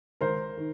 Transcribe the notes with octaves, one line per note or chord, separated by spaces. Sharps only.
G#1 A#4 C5
D#3